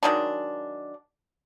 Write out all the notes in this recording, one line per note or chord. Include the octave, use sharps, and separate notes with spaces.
D#3 F#3 G#3 D4